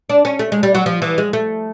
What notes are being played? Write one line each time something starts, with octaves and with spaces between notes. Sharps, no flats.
D4
C#4
A3
G#3
G3
F#3
F3
E3
G#3
A3